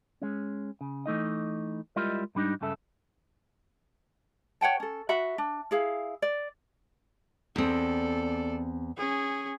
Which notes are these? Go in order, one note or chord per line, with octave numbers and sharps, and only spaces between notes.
G#3 C#4
C#3
E3 A3 D#4 D#5
G3 G#3 E4 F4 A#4 D#5
G#2 G3 D4 D#4
C#2 G2 C#3 A4 E5
C#5 F#5 G5 A5
C#4 A4
F#4 E5 F#5 B5
D4
E4 G#4 F5
D5
E2 C4 A4 D5
C#4 G#4